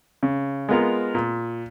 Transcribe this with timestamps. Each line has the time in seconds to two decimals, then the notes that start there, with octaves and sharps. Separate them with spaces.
0.23 C#3
0.69 G#3 B3 F4 A#4
1.15 A#2